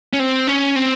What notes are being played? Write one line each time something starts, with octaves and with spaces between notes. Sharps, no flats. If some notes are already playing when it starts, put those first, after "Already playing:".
C#4
C4
C#4
C4